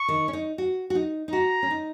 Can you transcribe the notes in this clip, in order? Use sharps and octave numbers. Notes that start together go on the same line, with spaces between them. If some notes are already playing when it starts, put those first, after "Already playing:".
Already playing: C#6
D#3
C#4
D#4
F#4
F#4
D#4
D#4
F#4 A#5
C#4
D#4